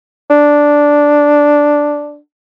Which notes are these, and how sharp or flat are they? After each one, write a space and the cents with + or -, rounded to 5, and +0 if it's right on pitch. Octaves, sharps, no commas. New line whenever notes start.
D4 -5